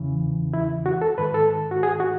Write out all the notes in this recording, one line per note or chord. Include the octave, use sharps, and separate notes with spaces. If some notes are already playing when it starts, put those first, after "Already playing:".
Already playing: E2 C#3 E3
E4
F#4
A4
G#2 D#3 B4
A4
F#4
G#4
F#4